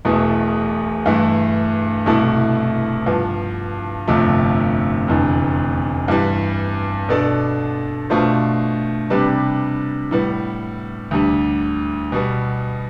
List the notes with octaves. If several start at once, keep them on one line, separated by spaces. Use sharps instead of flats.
E1 E2 B2 A3
G2 E3 A3 E4
C2 B2 A3 E4 A4
G2 F3 B3
G1 F2 C3 F3 A3
F1 E2 D3
G2 E3 G3
B2 B3 D4 A4 D5
B2 A3 D4 F4 C5
C3 G3 D4 G4 B4
A2 G3 B3
D2 D3 G3
B2 G3 B3